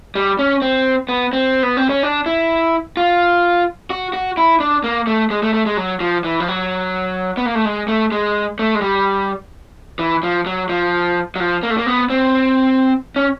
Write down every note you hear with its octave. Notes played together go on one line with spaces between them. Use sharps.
G3
C#4
C4
B3
C4
B3
C4
C#4
D4
E4
F4
F#4
F#4
E4
D4
A#3
A3
G#3
A3
A3
G#3
F#3
F3
E3
F3
F#3
B3
A#3
A3
G#3
A3
G#3
A3
G#3
G3
E3
F3
F#3
F3
F#3
F3
A#3
A3
A#3
B3
C4
C#4